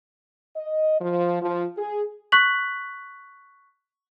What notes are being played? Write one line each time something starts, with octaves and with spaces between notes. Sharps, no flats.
D#5
F3
F3
G#4
C#6 F#6 B6 F#7